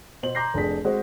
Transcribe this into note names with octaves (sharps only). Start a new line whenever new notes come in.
B2 C5 C6 F#7
A#5 C6 D6 G6 A#6 C7
F1 D4 G#4 B6
G#3 C4 F#4 C5 F#5